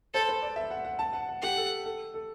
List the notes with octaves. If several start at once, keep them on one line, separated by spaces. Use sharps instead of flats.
A4 C5
B4
D5
E5
F#5
F#5
A5
F#5
F#5
G4 F#5
A4
A4
A4